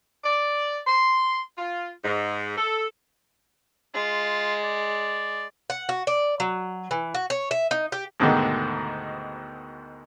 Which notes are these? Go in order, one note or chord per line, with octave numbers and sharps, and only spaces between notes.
D5
C6
F4
G#2
A4
G#3 F4
D5
F#5
F#4
D5
F#3
E3
F#4
C#5
E5
D#4
G4
D2 G#2 B2 D3 D#3